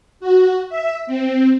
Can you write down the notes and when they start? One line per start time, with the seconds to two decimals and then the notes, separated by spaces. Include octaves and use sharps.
0.20 F#4
0.69 E5
1.07 C4